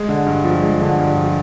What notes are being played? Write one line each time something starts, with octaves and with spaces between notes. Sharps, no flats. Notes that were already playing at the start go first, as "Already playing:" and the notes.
Already playing: G#3
D3
G2
F3
G#3
D3
G2
F3